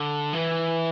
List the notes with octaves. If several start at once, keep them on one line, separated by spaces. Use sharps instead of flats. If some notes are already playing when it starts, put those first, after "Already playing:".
Already playing: D3
E3